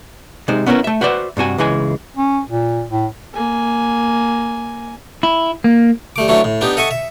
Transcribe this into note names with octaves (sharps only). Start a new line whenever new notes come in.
C3 G#3 D#4 C5
B3 C#4 E4 G#4 A#4 B4
A3 E5
F#4 B4 C5 D5 E5
G2 C3 F#4 G#5
C#2 C#3 E3 G#3 G#5
C#4
A#2
A2
A#3 G#5
E4
A#3
G3 A3 D6
E3 F#3 A3 C#4 D4 E4
A2
B3 D4 D#4 G4
A4 D#5 E5 F#5 G#5 C#6
E5